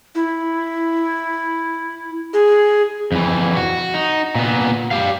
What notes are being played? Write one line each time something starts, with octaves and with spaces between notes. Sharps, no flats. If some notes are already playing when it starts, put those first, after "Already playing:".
E4
G#4
F2 E3
F#4
D#4
A#2 B3
G4 F5